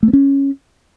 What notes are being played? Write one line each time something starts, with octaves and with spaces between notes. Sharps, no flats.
A3
B3
C#4